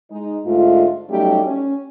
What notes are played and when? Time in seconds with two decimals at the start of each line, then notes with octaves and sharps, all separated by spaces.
0.11 G#3 D#4
0.46 G#2 D3 A3 F4
1.10 F#3 G3 A3 C#4 D#4 G4
1.45 C#4